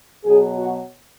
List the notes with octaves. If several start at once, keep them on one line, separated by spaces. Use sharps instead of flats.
B2 F#3 G#4
F#4